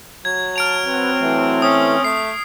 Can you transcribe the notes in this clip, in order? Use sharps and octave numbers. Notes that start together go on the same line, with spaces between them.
F#3 G#6
A5 F6 D7 F7
C4 B4 F#5
E3 A3
C#4 D#6
A3 C7